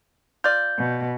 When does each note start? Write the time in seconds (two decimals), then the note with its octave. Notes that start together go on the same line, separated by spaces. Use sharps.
0.44 F4 D5 G6
0.78 B2